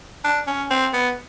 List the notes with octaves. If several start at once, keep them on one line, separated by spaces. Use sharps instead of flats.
D4
C#4
C4
B3